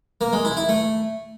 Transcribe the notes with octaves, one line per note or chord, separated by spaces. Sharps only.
A#3
G#3
E4
E4
A3